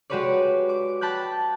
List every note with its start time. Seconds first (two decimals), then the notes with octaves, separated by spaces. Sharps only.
0.10 G#3 F#4 G4 B4 C#5 D5
0.69 D6
1.01 G5 A5 B5 F#6 G6